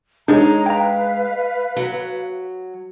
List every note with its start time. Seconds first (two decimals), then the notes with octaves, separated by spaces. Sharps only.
0.28 G#3 D4 D#4 G#4 C#5 A#5
0.66 B4 F5 G5 A#5
1.76 F#3